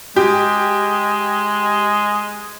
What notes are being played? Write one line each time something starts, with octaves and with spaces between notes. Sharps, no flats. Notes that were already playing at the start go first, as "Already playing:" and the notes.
G#3 G4